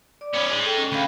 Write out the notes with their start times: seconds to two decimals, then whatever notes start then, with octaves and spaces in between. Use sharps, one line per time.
0.21 D5 D6
0.33 B3 C#4 C#5 B5
0.50 G#3 D#4
0.65 A4 G5
0.78 C#4
0.92 D2 F5 G5 B5